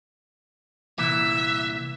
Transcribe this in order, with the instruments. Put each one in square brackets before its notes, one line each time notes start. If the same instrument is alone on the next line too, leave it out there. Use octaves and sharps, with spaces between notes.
[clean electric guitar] C2 A#2 E3 [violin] E5